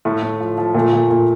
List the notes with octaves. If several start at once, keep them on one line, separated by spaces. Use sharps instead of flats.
A2 A3
A2
F3
F3
A#2 A3
A#2
A#2